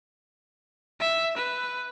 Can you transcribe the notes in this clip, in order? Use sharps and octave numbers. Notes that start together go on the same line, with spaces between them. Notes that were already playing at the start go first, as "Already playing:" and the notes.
E5
B4